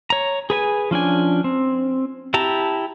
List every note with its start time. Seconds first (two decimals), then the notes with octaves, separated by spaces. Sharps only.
0.10 C#5 A#5
0.50 G#4 B4 G#5
0.91 F3 C#4 D4 G#5
1.44 C4
2.34 E4 G4 A5 A#5